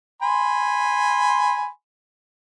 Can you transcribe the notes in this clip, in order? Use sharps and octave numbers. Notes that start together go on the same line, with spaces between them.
G#5 B5 C6